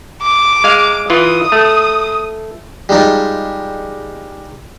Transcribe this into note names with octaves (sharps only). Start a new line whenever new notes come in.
D6
G#3 F5
E3 F4 D#6
A3
G3 G#3 D#4 F4